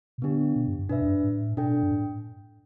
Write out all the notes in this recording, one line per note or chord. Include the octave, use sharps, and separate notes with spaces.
B2
D3 B3 D4 G4
B2
G2
G2
B2 D4 B4 E5
E2
G2
A2
B2 D4 A4 G5
G2
A2